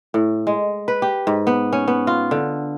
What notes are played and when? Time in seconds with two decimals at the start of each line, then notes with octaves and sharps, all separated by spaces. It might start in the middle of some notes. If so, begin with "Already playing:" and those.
0.14 A2
0.47 G#3
0.88 B4
1.02 G4
1.27 G#2
1.47 B3
1.73 C#4
1.88 B3
2.07 F4
2.31 D3